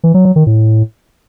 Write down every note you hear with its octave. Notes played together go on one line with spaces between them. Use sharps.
E3
F#3
F#3
D#3
A2